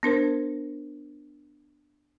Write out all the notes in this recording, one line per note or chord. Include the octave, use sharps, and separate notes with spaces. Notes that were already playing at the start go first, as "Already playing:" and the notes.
B3 D4 A#4 C5